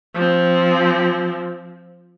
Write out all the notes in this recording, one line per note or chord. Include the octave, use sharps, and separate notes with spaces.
F3 C4